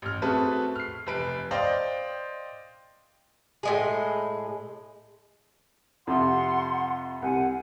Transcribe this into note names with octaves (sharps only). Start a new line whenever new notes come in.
A1 F6
A3 C4 F#4 G#4 A4 B4
F6 C7
F1 B4 D7
C5 D5 D#5 F5 G5 C6
A2 G#3 G#4
F2 C3 F#5 C6
C2 F#5 G#5